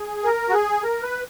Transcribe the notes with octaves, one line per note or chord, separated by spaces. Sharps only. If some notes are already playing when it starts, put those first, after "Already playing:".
Already playing: G#4
A#4
F#4
G#4
A#4
B4